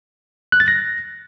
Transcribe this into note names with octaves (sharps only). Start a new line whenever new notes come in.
F#6
A6
A#6